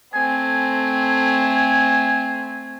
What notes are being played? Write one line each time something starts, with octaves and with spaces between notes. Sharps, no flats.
A3 C4 G#5